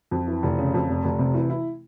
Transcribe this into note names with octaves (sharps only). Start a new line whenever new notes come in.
F2
E3
F1
C#3
F2
F1
F1
C3
E3
E4